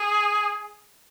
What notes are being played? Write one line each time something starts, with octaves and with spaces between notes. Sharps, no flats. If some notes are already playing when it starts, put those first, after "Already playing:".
Already playing: G#4